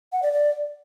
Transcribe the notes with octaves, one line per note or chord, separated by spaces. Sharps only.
F#5
D5
D5